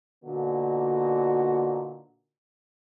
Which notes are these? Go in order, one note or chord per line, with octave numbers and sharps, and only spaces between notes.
A#2 D3 A#3 B3 D#4 F#4